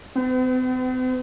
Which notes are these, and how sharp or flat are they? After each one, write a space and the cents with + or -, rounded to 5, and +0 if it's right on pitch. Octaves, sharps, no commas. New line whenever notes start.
C4 -45